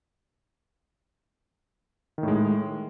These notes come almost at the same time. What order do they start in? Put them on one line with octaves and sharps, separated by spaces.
D#3 A2 G#3